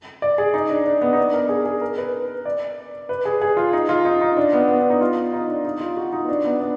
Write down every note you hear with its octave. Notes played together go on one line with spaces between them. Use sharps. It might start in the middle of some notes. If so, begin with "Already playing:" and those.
D5
G#4
D#4
D4
D4
B3
D#4
D4
A#4
G#4
G#4
A#4
B4
D5
B4
G#4
G#4
F4
D#4
F4
D#4
D#4
D4
B3
B3
D4
D#4
F4
D#4
D4
D#4
F4
F#4
D#4
B3
D4
B3
D4